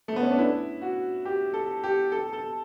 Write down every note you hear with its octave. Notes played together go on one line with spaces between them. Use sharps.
A3
B3
C#4
D4
E4
F#4
G4
A4
G4
A4
A4